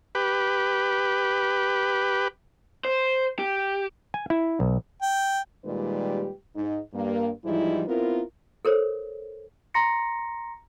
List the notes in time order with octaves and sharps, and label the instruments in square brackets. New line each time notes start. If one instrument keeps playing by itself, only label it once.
[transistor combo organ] G4 B4
[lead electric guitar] C5
G4
[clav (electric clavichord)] G#5
E4
B1
[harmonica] G5
[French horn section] A#2 D#3 G3 G#3 G4 B4
G#2 D#4
G2 A#3
G#2 E3 F3 G3 D#4 E4
B3 C4 E4 F4 A#4
[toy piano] A4 A#4 C5 C#5
[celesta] A#5 C6 A#6 C#7